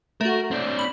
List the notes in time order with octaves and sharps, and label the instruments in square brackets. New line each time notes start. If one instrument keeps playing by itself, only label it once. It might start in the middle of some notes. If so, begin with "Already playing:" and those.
[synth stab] A3 F#4 [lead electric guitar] A#4
[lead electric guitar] C4 D4
[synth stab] B5